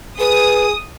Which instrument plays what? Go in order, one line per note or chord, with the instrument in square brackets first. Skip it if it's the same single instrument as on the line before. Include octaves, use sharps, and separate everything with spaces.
[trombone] G#4 [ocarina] B4 [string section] D#6